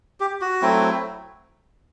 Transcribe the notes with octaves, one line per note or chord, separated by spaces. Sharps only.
G4
F#4
F#3 A3 C4 E4